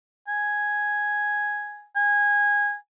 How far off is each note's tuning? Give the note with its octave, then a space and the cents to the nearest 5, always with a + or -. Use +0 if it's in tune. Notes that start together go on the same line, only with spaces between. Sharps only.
G#5 +0
G#5 -15